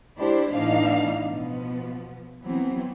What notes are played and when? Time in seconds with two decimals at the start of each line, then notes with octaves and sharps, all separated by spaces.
0.16 G#3 D4 E4 G4 C5
0.52 A2 E3 B3 D4 D#4 F5
1.24 B2 F3 B3
2.43 E3 F#3 B3 C4